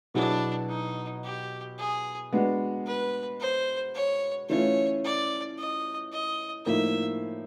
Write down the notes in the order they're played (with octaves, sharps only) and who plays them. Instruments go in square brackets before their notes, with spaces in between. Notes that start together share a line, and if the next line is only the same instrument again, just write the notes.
[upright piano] B2 F#3 B3 E4 G#4 [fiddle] D4
[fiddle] D#4
G4
G#4
[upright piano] G#3 B3 D4 F#4
[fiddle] B4
C5
C#5
[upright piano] E3 A3 C#4 F4 [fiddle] C#5
[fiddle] D5
D#5
D#5
[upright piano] A2 F3 A#3 D#4 [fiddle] E5